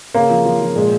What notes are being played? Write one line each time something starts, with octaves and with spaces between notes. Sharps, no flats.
C#3 A#3
F3
F3
F3
A#2 G#3